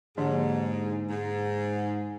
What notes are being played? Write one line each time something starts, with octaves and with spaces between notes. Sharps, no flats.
G#2 D3 F3 A#3 D4 G4
G#2